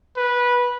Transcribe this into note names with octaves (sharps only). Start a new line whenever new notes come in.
B4